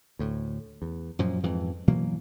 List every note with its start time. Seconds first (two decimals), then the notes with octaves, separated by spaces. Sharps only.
0.19 D2 A2
0.82 E2
1.19 F#2 A#2 F3
1.44 F2 G#2 E3
1.88 B2 E3 F#3 A#3